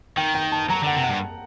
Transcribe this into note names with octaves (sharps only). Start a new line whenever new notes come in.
D#3 G5
G5
A5
F#3 A#5
D3 F#5
C3
F#5
G2